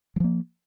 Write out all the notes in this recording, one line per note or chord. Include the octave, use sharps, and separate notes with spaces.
F3 F#3 A#3